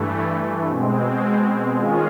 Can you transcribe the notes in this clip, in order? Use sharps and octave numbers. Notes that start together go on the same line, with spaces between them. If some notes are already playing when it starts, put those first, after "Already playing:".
Already playing: G2 E3 A3
B2 G#3 C4
D#3 G#3 C#4 F4 G#4